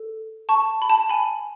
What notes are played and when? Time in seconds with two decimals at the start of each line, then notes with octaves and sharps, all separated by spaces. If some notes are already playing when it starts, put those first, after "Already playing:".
Already playing: A4
0.49 A5 C#6
0.82 B5
0.89 A5
1.09 G#5 B5